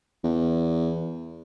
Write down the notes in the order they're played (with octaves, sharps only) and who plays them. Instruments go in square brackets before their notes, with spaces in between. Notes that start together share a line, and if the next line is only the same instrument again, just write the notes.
[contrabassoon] E2